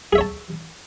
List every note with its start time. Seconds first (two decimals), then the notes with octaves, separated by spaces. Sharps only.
0.13 G#4
0.15 E5
0.18 C#5
0.21 A5